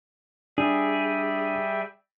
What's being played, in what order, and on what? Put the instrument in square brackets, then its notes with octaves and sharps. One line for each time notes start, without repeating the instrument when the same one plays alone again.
[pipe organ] G3 E5 G5 [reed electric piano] D4 [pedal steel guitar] G#4